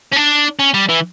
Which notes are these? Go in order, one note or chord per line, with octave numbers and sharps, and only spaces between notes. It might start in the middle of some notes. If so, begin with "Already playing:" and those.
C#4
D4
C#4
G3
E3